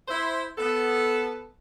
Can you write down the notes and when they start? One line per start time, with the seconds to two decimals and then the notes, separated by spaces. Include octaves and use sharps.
0.08 E4 C5
0.58 B3 A4